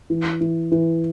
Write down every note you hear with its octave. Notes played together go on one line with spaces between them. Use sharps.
E3
E3
E3